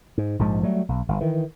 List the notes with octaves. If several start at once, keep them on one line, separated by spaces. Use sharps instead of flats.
G#2
A#1 G#2 F3 G#3
F#3 G3 A3
B1
G1
D#3 E3